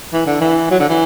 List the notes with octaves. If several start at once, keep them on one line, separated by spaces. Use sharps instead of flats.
E3
D3
E3
F#3
D3
E3